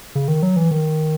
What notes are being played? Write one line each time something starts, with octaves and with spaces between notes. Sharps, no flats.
C#3
D#3
F#3
E3
D#3